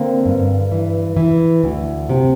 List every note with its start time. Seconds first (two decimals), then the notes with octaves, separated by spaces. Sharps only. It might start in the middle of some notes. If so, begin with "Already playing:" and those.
Already playing: D3 A#3 C4
0.26 G2
0.71 E3
1.17 E3
1.63 D2
2.09 C3